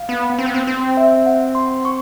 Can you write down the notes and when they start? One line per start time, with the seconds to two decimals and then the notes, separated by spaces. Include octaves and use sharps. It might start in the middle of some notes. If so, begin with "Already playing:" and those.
Already playing: F5
0.09 B3
0.39 C4
0.46 B3
0.54 C4
0.67 C4
0.97 E5
1.26 F#5
1.55 C6
1.85 C#6